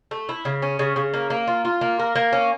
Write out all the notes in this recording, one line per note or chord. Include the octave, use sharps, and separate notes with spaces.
A3
E4
C#3
C#4
C#3
C#3
A#3
A#3
F4
F4
A#3
A#4
A#3
C#4